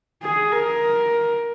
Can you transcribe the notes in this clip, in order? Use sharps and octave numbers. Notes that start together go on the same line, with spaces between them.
G#4
A#4